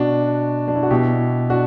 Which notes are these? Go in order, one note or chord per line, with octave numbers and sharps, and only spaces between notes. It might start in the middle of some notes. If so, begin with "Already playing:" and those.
Already playing: B2 D4 F#4
D4
E4
F#4
B2 E4 G4
D4 F#4